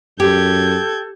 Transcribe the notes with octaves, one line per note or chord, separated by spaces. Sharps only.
F#2 G4 A4 G6 G#6